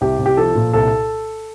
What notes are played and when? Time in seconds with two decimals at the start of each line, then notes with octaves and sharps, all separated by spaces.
0.01 C2 G4
0.19 C2
0.26 G4
0.37 F3 A4
0.55 A#2
0.73 C2 A4